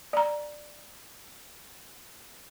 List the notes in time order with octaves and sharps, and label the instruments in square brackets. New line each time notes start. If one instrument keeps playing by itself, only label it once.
[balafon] D5 A#5